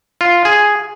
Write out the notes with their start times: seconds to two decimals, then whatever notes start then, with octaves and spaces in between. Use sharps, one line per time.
0.21 F4
0.45 G#4